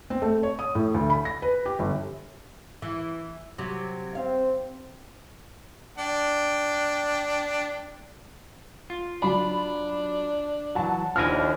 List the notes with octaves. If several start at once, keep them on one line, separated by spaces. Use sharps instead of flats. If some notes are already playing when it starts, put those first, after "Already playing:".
C4
A3
C#5
D#6
A2
D2
B5
A#6
B4
G4
G1
E3
C3 F#3
C4 F5
D4 G5
F4
F#3 D4 B5
E3 F#3 F#5 A5
D#2 F3 D4 E4 G#5 F6 A#6